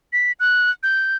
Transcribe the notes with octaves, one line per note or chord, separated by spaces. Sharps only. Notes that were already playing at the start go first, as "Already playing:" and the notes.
B6
F#6
G6